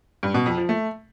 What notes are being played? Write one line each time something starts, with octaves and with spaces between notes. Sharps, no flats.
G2
B2
F2
F3
A3